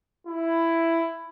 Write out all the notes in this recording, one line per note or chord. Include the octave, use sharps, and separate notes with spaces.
E4